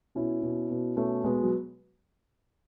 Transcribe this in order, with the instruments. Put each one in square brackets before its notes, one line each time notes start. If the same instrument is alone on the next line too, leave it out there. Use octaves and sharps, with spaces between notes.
[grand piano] B2 C#4 E4
B2
B2
B2 A3 C#4
B2 G#3 B3
F#3